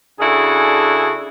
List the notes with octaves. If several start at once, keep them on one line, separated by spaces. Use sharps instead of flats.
C#3 D4 E4 F#4 G#4 A4